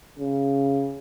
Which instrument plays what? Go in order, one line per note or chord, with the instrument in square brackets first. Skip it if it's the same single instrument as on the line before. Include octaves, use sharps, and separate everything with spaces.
[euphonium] C#3